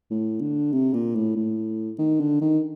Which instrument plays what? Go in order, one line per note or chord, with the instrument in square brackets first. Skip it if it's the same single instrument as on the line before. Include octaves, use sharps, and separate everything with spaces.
[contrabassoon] A2
D3
C3
A#2
A2
A2
D#3
D3
D#3